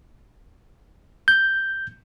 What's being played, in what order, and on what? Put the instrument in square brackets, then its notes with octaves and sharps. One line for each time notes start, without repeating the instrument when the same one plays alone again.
[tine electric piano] G6